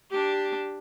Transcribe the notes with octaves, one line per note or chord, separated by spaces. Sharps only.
D4 G4